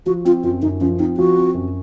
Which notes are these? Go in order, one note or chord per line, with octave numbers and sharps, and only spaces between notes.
F3 F#4
C4 F4
F#2 F4
F#2 D#4
F3 C#4
C4 D#4
F3 F#4
C4
F#2